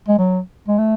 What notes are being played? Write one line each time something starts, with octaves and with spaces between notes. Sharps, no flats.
G#3
F#3
G#3
A3